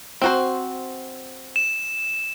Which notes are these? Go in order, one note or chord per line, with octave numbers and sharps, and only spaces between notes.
C4 F#4 C5
E7